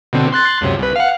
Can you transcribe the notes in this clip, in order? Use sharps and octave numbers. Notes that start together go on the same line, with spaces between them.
B2 D3 C4
C6 F#6 A6
C#2 F#2 C3
C2 B4
F5 F#5